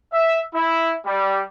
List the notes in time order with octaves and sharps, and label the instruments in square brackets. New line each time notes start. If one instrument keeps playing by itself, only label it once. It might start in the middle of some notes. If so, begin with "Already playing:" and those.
[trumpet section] E5
E4
G3